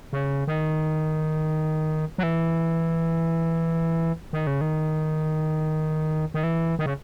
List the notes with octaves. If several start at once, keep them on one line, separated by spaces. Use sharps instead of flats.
C#3
D#3
F#3
E3
D#3
C#3
D#3
D#3
E3
D#3
C#3